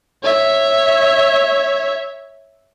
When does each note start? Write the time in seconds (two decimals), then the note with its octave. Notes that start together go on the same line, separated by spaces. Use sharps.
0.23 C#5 E5